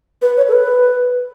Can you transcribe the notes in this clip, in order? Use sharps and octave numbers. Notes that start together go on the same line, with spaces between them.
B4
C#5
A4
B4